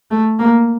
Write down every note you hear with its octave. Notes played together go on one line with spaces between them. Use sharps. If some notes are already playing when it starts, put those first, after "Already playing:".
A3
A#3